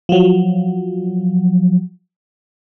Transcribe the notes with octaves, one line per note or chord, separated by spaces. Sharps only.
F3 F#3